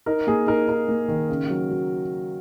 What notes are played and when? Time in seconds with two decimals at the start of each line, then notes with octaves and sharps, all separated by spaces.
0.06 D#4 A#4
0.27 A#3 G#4
0.47 D#4 A#4
0.68 D#4 A#4
0.89 A#3
1.08 D#3
1.29 C#3
1.50 F#3
1.70 F#3